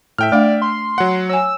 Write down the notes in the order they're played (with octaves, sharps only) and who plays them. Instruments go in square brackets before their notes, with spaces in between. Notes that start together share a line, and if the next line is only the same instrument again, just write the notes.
[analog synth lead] A2 [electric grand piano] E5 G5 F6
[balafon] A3 D4 F5 [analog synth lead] D5
[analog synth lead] C6
[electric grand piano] F#3 F#5
[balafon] C#5 G#5 [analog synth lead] E6